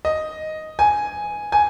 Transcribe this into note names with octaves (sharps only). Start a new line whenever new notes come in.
D#5
G#5
G#5